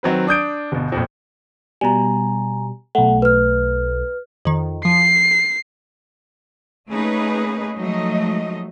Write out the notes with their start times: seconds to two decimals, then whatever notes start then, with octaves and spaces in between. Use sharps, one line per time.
0.03 D#3 F#3 C4 B4
0.27 D4 D#6 G6 D7
0.72 G1 B2
0.92 A#1 F2
1.81 B2 G3 G#5 A#5
2.95 B1 A3 F#5
3.22 B4 F6
4.45 F2 D#3
4.85 F3 C7
6.89 A3 A#3 C#4 D#4 G#4 B4
7.78 F3 F#3 G#3 A3 D#4 D#5